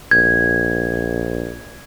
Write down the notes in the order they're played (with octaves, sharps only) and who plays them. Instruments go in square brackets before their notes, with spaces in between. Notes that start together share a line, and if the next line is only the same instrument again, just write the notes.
[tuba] A#1 [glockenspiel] G#6